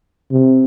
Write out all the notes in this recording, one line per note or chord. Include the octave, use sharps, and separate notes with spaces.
C3